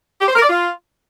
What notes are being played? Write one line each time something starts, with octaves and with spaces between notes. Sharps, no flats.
G4
C5
A#4
D5
F4